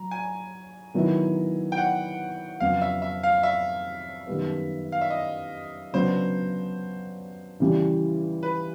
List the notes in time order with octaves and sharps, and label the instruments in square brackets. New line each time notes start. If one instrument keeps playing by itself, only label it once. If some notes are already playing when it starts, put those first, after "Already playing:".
Already playing: [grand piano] F#3 [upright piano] A#5
[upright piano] G#5
[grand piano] D#3 F#3 B3 E4
[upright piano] G5
F#5
[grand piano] F2 C#3 F#3 B3 [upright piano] F5
[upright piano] E5
E5
F5
E5
[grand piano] F#2 D#3 G3 B3
[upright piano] F5
E5
D#5
[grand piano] C#3 F#3 B3 D4 [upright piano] C5
[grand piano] C#3 E3 G3
[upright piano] B4